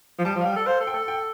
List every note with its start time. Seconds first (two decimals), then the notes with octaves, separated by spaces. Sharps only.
0.19 F3
0.25 G3 A5
0.35 F3
0.41 F5
0.45 G3 G5
0.56 A4
0.67 C5 F5
0.80 A4
0.87 G5
0.94 A4
1.08 G5